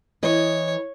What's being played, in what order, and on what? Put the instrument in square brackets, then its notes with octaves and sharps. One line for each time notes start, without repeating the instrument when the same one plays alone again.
[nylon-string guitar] E3 D#5 [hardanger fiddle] C#5